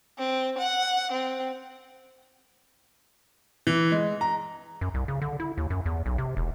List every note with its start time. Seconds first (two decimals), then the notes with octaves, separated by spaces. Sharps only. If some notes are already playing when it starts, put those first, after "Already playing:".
0.17 C4
0.57 F#5
1.11 C4
3.67 E3
3.92 G#3
4.21 A#5
4.81 F#2
4.94 C2
5.08 C#3
5.22 D3
5.40 E4
5.58 D#2
5.70 F#2
5.86 E2
6.06 B1
6.18 C3
6.37 E1